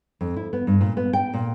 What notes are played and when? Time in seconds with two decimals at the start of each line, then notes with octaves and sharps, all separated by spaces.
0.21 F2
0.36 E4
0.53 B3
0.67 G2
0.81 A#2
0.97 B3
1.13 G5
1.34 A#2